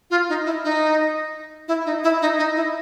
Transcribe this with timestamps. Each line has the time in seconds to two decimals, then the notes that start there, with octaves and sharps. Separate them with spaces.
0.10 F4
0.29 D#4
0.45 E4
0.64 D#4
1.68 E4
1.86 D#4
2.04 E4
2.22 D#4
2.39 D#4
2.56 E4